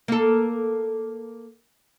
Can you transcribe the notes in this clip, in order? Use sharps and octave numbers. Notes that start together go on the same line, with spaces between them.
A#3 A4